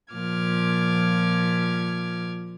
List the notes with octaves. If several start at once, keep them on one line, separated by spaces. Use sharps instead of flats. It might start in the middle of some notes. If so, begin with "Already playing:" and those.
A#2 F3 D6 F6 G#6